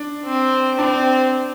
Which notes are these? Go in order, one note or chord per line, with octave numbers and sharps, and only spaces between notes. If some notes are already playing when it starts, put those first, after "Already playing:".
Already playing: D4
C4
C4 D4